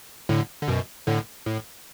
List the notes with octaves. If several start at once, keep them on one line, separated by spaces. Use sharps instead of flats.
A2 D3
D3
F#2 B2
A2 D3
A2